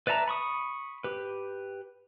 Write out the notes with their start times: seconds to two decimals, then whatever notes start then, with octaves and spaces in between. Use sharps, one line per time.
0.07 B4 D5 E5 A5 A#5
0.28 B5 C#6 D#6
1.04 G4 B4